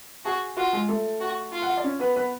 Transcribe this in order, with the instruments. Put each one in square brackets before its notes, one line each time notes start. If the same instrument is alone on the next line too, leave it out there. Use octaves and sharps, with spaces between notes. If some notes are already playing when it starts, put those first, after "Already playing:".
[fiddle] F#4 [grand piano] G#4 G#5
[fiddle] F4 [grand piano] F#4 F#5
[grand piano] G#3 G#4
A3 A4
[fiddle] F#4
F4
[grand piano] F#5
F5
D5
C#4 C#5
B3 B4
B3 B4